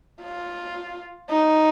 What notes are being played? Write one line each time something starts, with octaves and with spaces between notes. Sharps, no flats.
F4
D#4